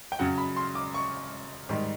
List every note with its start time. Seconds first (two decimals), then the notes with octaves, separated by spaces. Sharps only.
0.12 G5
0.19 F#2 C#3 F#3 F#5
0.38 B5
0.56 C6
0.75 D6
0.94 C#6
1.69 G#2 D#3 G3